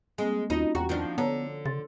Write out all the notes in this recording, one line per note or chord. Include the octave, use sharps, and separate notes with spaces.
G#3 A#3 C4 G#5
D#2 C#4 D#4 F4 F#4
E2 F#4 F#5 G5 A#5
D#3 F3 D4
D3 B3 C#5 A5 A#5
C#3 C6 A6